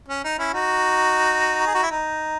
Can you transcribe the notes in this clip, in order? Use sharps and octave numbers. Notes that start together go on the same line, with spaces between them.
C#4
D#4
C#4 E4
D#4 F#4
G#4
F#4
E4
D#4